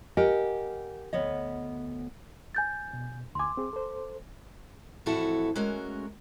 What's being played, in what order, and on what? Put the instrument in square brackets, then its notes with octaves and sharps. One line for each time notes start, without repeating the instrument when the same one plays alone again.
[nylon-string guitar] G4 A#4 D#5 F#5 G#5
D2 B3 C#5 D#5
[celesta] G#5 G6 A6
[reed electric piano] B2
[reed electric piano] D2 G#5 [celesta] C6 D6
[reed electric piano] C4 G#4
A4 C5
[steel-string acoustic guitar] F2 A2 E3 E4 F#4 A4
G#3 A3 C#4 F#4 A#4